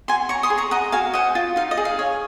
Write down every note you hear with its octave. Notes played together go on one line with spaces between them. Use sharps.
F#4 G#5 C6
C#5 A#5 C#6
C6 D#6
G#4
A#5 C#6
D#5 F#5 A#5
F#4 F5 G#5
C5 D#5 F#5
F4
D#4 F5
D#5
G#4
F5
C#5